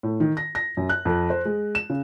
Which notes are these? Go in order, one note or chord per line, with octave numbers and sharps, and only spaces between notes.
A2
D#3
A#6
A#6
F#2
F#6
F2
C5
G#3
E7
C#3